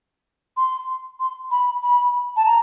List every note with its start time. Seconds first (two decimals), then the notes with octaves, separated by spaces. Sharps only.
0.57 C6
1.20 C6
1.51 B5
1.83 B5
2.36 A5
2.46 A#5